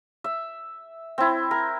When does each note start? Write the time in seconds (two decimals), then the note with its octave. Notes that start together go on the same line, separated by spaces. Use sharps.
0.24 E5
1.18 C4 E4
1.51 A#4